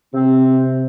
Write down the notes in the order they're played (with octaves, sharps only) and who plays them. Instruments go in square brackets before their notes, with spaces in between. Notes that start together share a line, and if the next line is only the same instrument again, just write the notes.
[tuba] C3 [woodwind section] C4